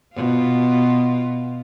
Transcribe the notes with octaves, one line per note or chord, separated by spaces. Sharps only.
B2 F4